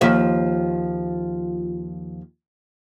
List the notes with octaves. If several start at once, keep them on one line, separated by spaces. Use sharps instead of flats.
D#2 F3 E5